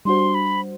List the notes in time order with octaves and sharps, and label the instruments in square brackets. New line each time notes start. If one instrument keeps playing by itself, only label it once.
[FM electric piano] G3 D4 F#4 C5 [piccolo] C6
[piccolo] B5